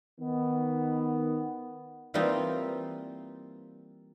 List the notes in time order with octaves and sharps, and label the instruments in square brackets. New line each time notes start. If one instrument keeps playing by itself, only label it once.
[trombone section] D#3 B3
[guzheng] E3 G3 A#3 C4 D#4 F4